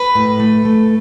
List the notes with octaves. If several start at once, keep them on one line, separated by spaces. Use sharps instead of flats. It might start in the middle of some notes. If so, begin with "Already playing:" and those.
Already playing: B4
A2
A3
A3